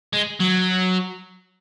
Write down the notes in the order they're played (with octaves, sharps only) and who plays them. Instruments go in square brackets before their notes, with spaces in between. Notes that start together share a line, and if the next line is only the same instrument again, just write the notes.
[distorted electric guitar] G#3
F#3